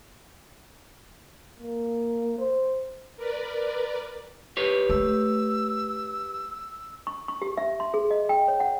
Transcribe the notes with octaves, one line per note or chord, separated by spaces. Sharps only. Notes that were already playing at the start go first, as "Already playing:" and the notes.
A#3
C5
A#4 B4 D5
G4 B4 C#5
A3 E6
C#6
C#6
G4
E5
C6
G#4
D#5
G5
C#5
F#5